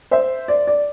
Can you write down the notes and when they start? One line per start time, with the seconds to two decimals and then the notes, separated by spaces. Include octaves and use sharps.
0.11 C5 E5
0.48 D5
0.67 D5